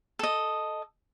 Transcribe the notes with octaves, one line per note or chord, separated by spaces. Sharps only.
A4 D#5